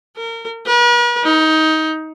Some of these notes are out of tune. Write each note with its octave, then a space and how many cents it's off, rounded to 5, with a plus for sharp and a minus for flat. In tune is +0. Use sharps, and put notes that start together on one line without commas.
A#4 -30
B4 -45
D#4 +20